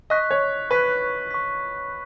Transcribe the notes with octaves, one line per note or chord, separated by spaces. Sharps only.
D#5 C#6 F#6 B6
C#5
B4 C#6 F#6 B6
C#6 F#6 B6